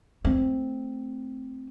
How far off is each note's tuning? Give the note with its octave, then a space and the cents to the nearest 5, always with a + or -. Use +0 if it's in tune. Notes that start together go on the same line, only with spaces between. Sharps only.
A3 +0 C4 +0